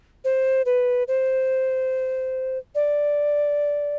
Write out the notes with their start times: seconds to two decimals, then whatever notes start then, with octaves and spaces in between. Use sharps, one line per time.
0.24 C5
0.66 B4
1.08 C5
2.75 D5